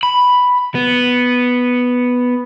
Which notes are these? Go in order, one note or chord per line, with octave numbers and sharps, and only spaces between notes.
B5
B3